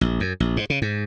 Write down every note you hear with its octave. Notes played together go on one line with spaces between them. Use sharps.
A#1
F#2
A#1
G#2
C#3
G#2